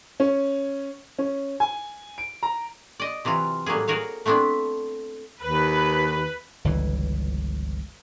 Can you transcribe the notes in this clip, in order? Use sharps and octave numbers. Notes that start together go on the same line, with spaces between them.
C#4
C#4
G#5
D7
A#5
D5 D#5
C3 E3 F#3 F4
A2 F#3 G3 A#3 G#4
F#4 G#4 A#4 C#5 F5
A3 B3 C4 D4 E4
D#2 B4
G1 C#2 E3